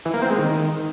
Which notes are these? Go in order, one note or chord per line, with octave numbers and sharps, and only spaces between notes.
E3
A#3
C4
G#3
D#3